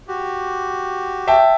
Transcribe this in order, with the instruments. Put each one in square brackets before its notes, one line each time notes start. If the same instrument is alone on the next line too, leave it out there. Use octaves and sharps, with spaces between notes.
[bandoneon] F#4 G4
[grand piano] E5 G5 A5